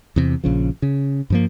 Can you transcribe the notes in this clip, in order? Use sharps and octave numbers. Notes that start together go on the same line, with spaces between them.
E2 C3
A#1 C#3 F3
C#3
G2 F3 A#3